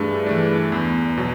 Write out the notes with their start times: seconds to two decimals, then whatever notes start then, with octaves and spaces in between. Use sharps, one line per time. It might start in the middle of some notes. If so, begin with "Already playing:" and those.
Already playing: G2 E3 A3 D4 G#4
0.26 E3 A3 D4
0.72 E2
1.18 B2 F#3